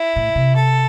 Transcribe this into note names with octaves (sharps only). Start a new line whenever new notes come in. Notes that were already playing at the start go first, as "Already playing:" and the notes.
Already playing: E4
A2
C3
A4